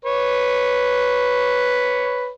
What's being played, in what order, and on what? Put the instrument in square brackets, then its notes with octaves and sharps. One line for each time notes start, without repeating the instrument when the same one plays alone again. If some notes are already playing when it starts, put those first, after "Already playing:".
[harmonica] B4 C#5